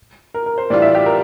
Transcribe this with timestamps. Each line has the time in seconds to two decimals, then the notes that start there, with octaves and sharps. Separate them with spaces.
0.34 A#4
0.46 A#4
0.58 C5
0.70 A2 E3 G3 D4 F4 D5
0.82 E5
0.95 G4
1.06 A#4